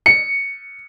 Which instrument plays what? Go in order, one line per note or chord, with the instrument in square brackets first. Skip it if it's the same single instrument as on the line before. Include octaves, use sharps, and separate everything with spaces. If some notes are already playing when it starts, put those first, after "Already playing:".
[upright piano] C#7